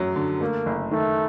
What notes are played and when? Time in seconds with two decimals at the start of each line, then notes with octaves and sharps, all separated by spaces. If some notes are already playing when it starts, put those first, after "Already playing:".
Already playing: F#2 F#3
0.16 D3
0.41 A3 A#3
0.66 F#1
0.91 D#3 A3